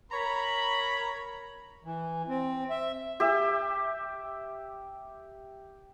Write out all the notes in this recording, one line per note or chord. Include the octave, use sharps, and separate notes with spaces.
A#4 C#5 A#5 B5
E3
C4
E5
G4 E5